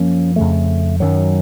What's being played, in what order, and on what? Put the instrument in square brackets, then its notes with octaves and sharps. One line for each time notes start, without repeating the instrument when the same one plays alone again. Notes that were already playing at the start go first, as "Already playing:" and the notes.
Already playing: [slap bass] F#2 F3 A#3 C#4
F2 C#3 A3
F#2 D#3 F#3